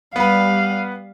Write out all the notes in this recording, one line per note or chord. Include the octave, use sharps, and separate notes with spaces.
G3 B3 B4 F5